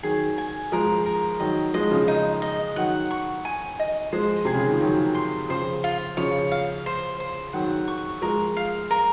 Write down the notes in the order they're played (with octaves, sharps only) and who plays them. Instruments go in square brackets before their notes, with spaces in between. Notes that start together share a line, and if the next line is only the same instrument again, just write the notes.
[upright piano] D#3 F#3 [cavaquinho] G#4
[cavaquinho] G#5
[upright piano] F3 G#3 [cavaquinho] A#4
[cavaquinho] A#4
[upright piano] D#3 F#3 [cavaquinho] D#5
[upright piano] F3 G#3 [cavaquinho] D#5
[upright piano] C#3 F3
[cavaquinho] D#4
D#5
[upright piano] D#3 F#3 [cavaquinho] F#5
[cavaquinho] C#6
G#5
D#5
[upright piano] F3 G#3 [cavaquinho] C5
[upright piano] C3 [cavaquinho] G#4
[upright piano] C#3
D#3
F3
[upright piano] D#3 F#3 [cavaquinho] G#4
[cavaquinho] C6
[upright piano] C#3 F3 [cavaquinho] C5
[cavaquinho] F4
[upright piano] C#3 F3 [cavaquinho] C#5
[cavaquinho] F5
C5
C5
[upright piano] D#3 F#3 [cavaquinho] F#5
[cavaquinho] C#6
[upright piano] F3 G#3 [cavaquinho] A#4
[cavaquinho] F5
A#4